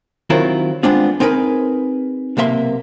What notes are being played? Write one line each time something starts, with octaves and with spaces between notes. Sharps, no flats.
D#3 F#3 C4 E4 F4 A#4
G2 G#3 B3 C4 D4 F4
C4 D#4 G#4 A#4 B4
B1 C3 A#3 E5 C6